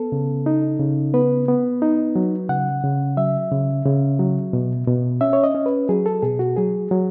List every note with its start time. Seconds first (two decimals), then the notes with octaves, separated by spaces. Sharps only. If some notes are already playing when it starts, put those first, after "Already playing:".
Already playing: B3 A4
0.12 C#3
0.46 D#4
0.80 C#3
1.14 B3 B4
1.48 B3
1.82 D#4
2.16 F#3
2.49 C#3 F#5
2.84 C#3
3.17 F#3 E5
3.51 C#3
3.85 C#3
4.19 F#3
4.53 B2
4.87 B2
5.21 C#4 E5
5.33 C#5
5.44 D#5
5.55 C#4
5.66 B4
5.89 F#3 G#4
6.06 A4
6.23 B2 G#4
6.39 F#4
6.56 F#3 G#4
6.91 F#3